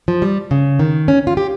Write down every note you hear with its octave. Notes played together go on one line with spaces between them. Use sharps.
F3
G3
C#3
D#3
C#4
F4
G4